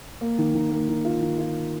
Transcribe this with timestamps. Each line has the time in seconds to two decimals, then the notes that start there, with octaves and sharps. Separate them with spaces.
0.21 A#3
0.38 D#3
0.55 D#3
0.71 A#3
0.89 D#3
1.05 F4
1.22 D#3
1.39 F4